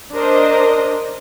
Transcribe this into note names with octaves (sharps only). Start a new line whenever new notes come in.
D4 A#4 C5 D#5